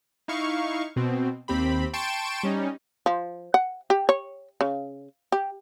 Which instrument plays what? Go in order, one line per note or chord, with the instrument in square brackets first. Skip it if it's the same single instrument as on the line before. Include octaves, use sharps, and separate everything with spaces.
[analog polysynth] D#4 E4 F5 C#6
B2 C4
D#2 C4 G4 B5
G5 A5 C6 C#6 D7 E7
G3 C#4 D#4
[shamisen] F3
F#5
G4
C#5
C#3
G4